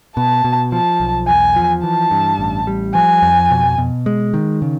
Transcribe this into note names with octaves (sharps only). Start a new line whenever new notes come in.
B2 A5
B2
F3 A5
B1
E2 G#5
F3
E3 A5
G2
A1
G3
F3 G#5
F2
B2
B2
G#3
D#3
C#3